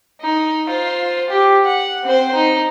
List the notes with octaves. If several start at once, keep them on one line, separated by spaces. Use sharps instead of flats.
D#4
F4 C5
G4
F#5
C4 C5
D#4